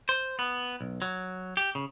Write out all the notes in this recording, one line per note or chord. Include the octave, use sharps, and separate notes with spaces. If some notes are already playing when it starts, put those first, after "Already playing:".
C5
B3
B1
F#3
G4
C#3